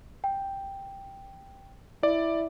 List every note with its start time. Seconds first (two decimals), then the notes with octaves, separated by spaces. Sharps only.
0.24 G5
2.03 E4 D5